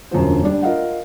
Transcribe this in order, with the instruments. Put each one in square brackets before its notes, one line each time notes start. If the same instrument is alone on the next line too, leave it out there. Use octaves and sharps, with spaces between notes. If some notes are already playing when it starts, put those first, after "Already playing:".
[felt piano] E1 F#2 D3 F3 C5
G3 D4
F4 A#4 D#5 F5 F#5